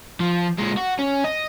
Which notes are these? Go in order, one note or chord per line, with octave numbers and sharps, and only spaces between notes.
F3
A#2 G#3
F#4
C#4
D#5